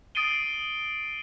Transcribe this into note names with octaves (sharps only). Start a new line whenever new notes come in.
D#6 A6 C7 D7 D#7 G7